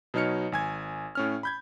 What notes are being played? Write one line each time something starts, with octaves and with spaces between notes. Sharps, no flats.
B2 F#3 D#4 C#5 F6 C#7
G#1 G#5 G#6
A2 C#4 F6
B5 G6 G#6